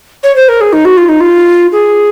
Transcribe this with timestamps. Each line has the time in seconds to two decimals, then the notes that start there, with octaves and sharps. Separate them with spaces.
0.23 C#5
0.36 C5
0.49 A#4
0.61 G#4
0.73 D#4
0.85 F#4
0.97 F4
1.09 D#4
1.20 F4
1.72 G#4